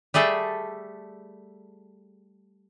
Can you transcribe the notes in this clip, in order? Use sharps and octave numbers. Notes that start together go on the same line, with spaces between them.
G3 A3 G#4 A4